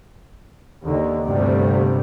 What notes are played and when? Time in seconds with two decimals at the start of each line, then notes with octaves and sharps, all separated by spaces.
0.83 D#2 D3
1.24 G1 D2 G2 C3 G3 A3